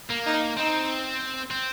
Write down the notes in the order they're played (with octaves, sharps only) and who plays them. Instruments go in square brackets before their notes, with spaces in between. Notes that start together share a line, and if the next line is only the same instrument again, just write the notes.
[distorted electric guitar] A#3
[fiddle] D#4
[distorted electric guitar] C4 [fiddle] D#4
[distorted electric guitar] C4